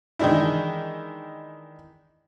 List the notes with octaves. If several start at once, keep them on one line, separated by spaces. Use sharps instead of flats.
D#3 E3 G#3 D4 E4